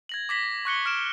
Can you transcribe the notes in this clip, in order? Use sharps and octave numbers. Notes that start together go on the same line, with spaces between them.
G#6 A#6 F#7
D6 A#6 B6 F#7
C#6 F#6 C#7 G7
F6 B6 D7 E7